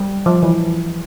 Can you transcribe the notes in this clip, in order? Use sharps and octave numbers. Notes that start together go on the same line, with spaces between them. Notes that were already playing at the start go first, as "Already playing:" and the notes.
Already playing: G3
F3
E3